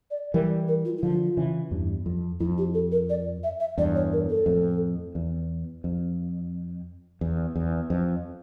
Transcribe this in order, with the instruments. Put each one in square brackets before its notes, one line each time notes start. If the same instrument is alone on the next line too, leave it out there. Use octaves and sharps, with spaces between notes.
[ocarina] D5
[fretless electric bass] E3 G3 [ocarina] A#4
[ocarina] A#4
F4
E4
[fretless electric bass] D3 F3 [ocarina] F4
[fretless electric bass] C#3 E3
E2 G2
F2
[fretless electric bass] F2 [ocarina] E4
[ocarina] G4
A4
A#4
D5
E5
E5
[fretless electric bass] E2 G2 [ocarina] D5
[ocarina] C#5
A#4
A4
[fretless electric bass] F2 A2
E2
F2
E2
E2
F2